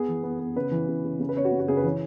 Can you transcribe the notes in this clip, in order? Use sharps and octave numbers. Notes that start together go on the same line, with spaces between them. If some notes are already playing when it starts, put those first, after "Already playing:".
Already playing: B3 G#4
E3
B3
B3
C#3 B4
E3
C#3
C#3
C#3
B4
C#4 C#5
F#4
C#3
F#4
C#3 G#4
B4
E3 C#5